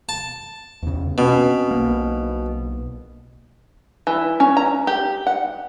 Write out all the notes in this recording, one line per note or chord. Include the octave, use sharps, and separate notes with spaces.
A5
E2 C#3
B2 C4 C#4
B1 A#3
E3
C#4
A#5
G4
F#5